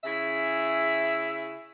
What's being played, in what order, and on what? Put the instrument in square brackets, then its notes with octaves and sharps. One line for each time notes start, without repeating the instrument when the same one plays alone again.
[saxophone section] C#3 E4 G#4 E5